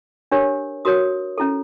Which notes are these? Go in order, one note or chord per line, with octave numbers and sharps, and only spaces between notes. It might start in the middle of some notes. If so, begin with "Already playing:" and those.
D4 G4 A#4 C#5
F#4 A#4 C#5 D#6
C#4 E4 A4